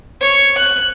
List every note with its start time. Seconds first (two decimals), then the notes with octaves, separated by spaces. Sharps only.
0.21 C#5
0.58 F#6